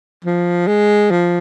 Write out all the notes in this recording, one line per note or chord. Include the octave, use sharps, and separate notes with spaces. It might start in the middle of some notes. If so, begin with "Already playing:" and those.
F3
G#3
F3